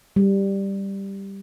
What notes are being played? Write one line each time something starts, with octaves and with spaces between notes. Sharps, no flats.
G3